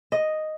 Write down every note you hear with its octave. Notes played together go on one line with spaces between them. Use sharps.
D#5